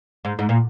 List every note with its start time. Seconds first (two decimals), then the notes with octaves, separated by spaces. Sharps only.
0.25 G#2
0.39 G#2
0.49 A#2